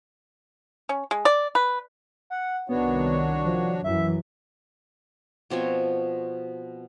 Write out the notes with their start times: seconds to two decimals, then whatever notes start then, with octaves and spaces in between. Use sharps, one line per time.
0.89 C#4
1.11 G#3
1.25 D5
1.55 B4
2.30 F#5
2.69 C2 D#3 B3 D4 F#4 C#5
3.45 F3
3.84 F#2 E3 F#3 E5
5.50 B2 F3 C4 C#5